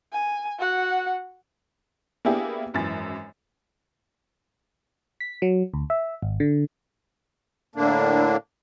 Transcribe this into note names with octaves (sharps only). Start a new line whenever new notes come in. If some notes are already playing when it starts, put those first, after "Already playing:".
G#5
F#4 F#5
A#3 B3 D4 E4 G4 G#4
G#1 F#2 E3 A6
B6
F#3
D2
E5
G#1
D3
A2 D3 A#3 D4